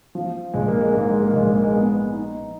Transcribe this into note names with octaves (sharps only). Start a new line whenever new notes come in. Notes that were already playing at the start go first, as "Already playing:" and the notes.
F3
A#1 G#3
A#3
G#3
G#2 A#3
G#3
A#3
A#1 G#3
A#3
G#3
B3
D#4